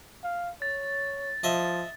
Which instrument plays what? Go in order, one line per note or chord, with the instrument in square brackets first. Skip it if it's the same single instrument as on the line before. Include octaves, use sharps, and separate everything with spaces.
[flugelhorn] F5
[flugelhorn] C#5 [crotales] A6
[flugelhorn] F3 [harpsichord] D#5 E5